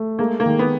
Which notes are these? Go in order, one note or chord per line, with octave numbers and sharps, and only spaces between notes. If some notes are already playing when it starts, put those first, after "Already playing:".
Already playing: A3
G#3 A#3
A#3
D#3
B3